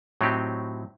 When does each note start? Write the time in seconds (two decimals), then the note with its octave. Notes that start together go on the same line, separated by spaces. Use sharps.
0.21 A2 F#3 C4 D#4 G4